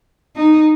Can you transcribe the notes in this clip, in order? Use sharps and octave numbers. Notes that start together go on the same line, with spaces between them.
D#4